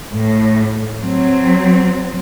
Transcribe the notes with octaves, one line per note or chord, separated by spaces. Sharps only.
A2
F#3 C4